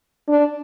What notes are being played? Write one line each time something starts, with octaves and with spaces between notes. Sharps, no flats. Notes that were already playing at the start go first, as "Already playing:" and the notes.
D4